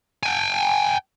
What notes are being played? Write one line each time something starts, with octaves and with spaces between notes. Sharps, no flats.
G5 G#5